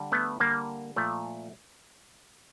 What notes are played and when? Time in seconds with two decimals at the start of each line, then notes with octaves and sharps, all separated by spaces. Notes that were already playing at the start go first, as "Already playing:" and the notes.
Already playing: D3 G3
0.12 A3 B3
0.40 D3 G3 A#3
0.96 A#2 F3 A3